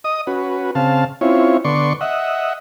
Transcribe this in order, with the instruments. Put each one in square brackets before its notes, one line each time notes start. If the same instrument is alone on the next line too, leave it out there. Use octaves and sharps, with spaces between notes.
[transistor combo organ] D#5 D#6
C#4 F#4 B4
C#3 C4 F5 A5
C4 C#4 E4 F4 C#5
D3 B3 D5 C6 C#6
D#5 E5 F#5